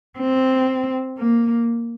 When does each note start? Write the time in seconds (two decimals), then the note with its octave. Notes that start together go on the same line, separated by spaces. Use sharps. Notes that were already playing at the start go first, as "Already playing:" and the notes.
0.19 C4
1.18 A#3